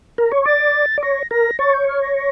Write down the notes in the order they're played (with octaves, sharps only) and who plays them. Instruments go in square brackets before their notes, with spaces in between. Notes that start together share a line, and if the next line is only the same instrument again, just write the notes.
[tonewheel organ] A#4
C#5
[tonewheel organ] D5 [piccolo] A6
[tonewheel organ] D5
[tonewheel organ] C#5 [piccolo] A#6
[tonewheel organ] A#4 [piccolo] A#6
[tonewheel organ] C#5 [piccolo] A6
[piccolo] G6
F6
A#6
A#6